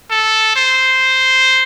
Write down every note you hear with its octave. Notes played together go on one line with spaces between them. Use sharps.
A4
C5